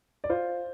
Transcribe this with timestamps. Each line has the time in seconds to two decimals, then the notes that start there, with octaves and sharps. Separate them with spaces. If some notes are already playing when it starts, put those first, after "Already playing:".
0.24 D5
0.30 F4 C5